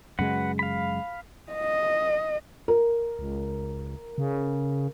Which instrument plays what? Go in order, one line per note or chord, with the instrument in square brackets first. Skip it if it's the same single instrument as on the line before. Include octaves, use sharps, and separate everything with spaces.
[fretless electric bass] F#2 C#3 G#3 [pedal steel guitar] F#4 B4 F#5
[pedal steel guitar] F5 B5
[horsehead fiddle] D#5
[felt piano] A#4
[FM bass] C#2
C#3